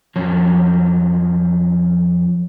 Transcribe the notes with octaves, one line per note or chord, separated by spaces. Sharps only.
F2 F3 F#3 C#4